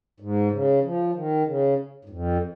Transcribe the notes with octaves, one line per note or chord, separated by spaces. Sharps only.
G#2
C#3
F3
D#3
C#3
G#2
F2